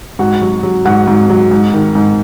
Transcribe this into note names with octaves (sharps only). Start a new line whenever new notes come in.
G#2 F#4 F#5
F#3
F#3
G#2 F#4 F#5
G#2
F#3
G#2
D#3
G#2